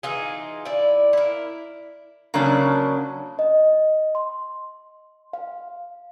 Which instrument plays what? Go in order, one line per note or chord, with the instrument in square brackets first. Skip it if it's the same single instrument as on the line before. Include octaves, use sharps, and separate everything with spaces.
[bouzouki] E3 D#4 F4 G#4
E4 D5
E4 A#4
[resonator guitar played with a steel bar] C#3 F#3 A#3 C#4 D4
[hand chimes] D#5
C6
F5